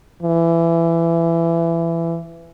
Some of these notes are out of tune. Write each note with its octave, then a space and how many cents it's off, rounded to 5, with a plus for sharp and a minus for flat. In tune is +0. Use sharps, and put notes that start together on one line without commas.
E3 +20